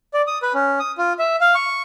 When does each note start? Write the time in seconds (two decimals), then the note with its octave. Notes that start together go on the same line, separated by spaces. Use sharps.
0.14 D5
0.27 D#6
0.42 B4
0.54 C#4
0.80 D#6
0.98 F4
1.19 E5
1.41 F5
1.55 C#6